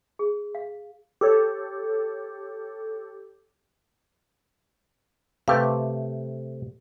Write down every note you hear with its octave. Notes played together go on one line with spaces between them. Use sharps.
G#4
F5
G4 A4 C#5
C3 A3 G4 B4 F5